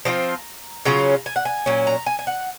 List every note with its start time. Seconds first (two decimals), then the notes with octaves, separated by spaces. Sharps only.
0.05 F3 C4 F4 A#5
0.85 C#3 F#3 C#4 F4 A#5
1.26 G#5
1.36 F#5
1.45 G#5
1.66 A#2 F#3 C#4
1.87 A#5
2.06 G#5
2.19 G#5
2.27 F#5